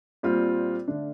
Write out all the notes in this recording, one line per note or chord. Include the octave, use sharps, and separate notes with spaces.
A#2 G3 C4 F4
D3 A3 D4